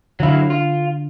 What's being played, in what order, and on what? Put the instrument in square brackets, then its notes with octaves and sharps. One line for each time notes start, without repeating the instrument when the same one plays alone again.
[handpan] D3 F5 [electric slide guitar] F#3 E4
[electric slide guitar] F4